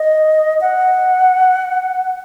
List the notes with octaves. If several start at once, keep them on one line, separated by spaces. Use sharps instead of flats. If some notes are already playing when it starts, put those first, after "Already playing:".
Already playing: D#5
F#5